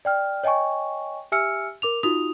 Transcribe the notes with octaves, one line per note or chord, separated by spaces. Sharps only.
D5 G5 F6
C#5 D#5 G5 G#5 C#6
G4 E5 G#5 E6 F6 C#7
A#4 D6 F7
D#4 F4 F#4 D#6 F7